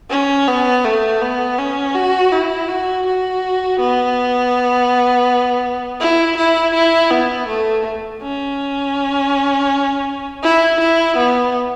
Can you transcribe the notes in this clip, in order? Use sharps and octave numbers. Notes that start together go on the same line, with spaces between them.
C#4
B3
A3
B3
C#4
F#4
E4
F#4
F#4
B3
E4
E4
E4
B3
A3
C#4
E4
E4
B3